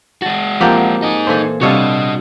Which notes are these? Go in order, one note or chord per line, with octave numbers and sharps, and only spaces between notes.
G#3 F#4 A5
F3 A#3 C4 G4 F#5 A5
D#4 G#4
A#2 E3 A4 C5 G#5
C3 G3 D4 F4 F#4 A4 C#5 D#5